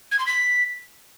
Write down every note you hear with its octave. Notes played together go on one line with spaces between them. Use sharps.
G#6
C6
B6